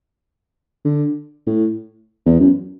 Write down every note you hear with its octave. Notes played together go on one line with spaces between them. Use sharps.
D3
A2
E2
F#2